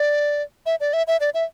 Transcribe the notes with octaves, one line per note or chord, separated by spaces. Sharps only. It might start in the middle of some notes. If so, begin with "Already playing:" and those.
Already playing: D5
E5
D5
E5
E5
D5
E5